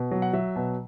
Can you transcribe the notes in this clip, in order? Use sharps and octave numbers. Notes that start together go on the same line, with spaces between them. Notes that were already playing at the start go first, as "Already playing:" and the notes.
Already playing: B2
F#3
F#5
F#3 E5
B2